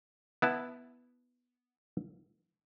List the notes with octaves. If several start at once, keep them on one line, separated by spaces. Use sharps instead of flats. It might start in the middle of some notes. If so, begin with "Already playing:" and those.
B3 E4 A5